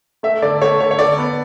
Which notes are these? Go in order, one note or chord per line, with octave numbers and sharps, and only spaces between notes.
A3 E5
D3 D5
A3 C#5
D3 C#5
C#5
D3 D5
B3